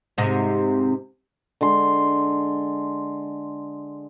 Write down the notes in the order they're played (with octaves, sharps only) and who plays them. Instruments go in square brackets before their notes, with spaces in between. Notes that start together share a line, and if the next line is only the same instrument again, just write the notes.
[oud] G#2 C3
[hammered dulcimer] D3 G#3 C6